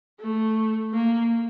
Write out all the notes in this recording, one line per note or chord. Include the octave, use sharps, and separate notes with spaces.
A3
A#3